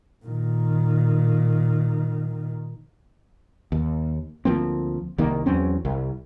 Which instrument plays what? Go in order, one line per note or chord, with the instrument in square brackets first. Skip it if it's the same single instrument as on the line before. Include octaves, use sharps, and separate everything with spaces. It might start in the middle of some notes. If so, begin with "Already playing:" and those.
[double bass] A#2 D#3
[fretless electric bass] D#2
D2 F3 A#3 C4
C2 D#3 A#3
E2 F#3 C4 C#4
C2